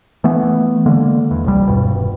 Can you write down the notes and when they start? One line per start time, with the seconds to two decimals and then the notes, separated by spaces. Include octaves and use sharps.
0.24 E3 A3 B3
0.86 D3 G#3 A#3
1.31 E2
1.45 D#1 C2 G3
1.67 D#1 G2 B2